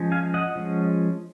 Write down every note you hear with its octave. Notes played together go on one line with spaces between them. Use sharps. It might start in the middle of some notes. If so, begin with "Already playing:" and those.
Already playing: F3 G#3 C#4
F5 G#5
D#5 F#5
F3 G#3 C#4